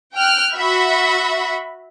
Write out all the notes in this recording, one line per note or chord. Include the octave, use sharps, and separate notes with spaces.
G5 F6 F#6
F#4 E5 B5